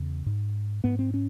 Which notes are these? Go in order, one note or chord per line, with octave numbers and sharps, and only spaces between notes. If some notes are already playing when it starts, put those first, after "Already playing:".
Already playing: E2 C#3
G#2
G#2 B3
C4
C#4